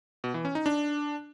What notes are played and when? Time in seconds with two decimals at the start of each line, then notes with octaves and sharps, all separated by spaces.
0.24 B2
0.34 E3
0.45 C#4
0.55 D#4
0.66 D4